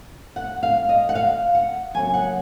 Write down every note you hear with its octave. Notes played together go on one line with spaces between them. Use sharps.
F#5
F5
D#5
F#5
F5
F#5
C#3 F#3 A#3 C#4 G#5
F#5